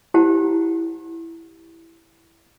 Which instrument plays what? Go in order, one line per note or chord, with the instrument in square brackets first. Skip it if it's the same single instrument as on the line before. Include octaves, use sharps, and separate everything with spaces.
[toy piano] E4 G4 C5 F#5 A5